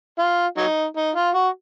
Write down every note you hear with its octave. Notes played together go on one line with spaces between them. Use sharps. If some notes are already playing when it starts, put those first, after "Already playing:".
F4
F#3 D#4
D#4
F4
F#4